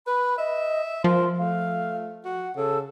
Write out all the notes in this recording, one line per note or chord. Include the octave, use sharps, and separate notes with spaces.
B4 B5
D#5 E5
F3 A#4 C6
A3 F5
F#4 F#5
C#3 A4